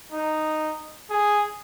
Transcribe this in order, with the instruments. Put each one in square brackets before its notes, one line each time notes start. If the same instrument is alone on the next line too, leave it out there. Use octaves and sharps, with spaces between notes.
[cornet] D#4
G#4